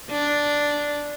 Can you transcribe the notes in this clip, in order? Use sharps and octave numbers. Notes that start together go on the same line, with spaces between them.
D4